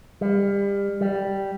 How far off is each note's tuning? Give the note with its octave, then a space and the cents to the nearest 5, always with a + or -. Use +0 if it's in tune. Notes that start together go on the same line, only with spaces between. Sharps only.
G3 +30
G3 -5